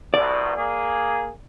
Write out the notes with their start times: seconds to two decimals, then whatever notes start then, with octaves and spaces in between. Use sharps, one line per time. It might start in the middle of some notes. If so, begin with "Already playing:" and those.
0.14 C2 B2 D5
0.56 A#3 G#4